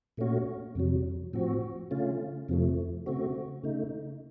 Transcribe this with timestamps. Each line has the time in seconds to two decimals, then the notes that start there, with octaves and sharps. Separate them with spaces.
0.17 A#2 A3 C#4 F#4
0.75 F2 C3 F#3
1.33 A2 F3 C4 F#4
1.91 C#3 A3 C#4 F4
2.49 F2 C3 F3 A3
3.06 C#3 A3 C4 F#4
3.63 C#3 A3 D#4